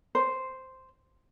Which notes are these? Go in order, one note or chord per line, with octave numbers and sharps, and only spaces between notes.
C5